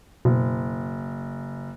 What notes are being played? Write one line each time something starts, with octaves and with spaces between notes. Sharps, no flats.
F#1 B2